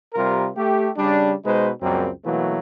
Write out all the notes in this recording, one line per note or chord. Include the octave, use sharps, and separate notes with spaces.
C3 G3 F4 A#4
A3 G4
C#3 G3 D4
B2 G#3 D#4 B4 C5
C#2 F#2 G3 A#3 C4
B2 E3 F#3 A3 A#3